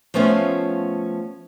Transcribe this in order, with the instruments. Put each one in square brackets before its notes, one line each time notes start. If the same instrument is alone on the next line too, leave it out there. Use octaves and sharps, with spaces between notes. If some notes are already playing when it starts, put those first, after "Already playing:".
[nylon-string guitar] F3 A3 B3 C#4 F4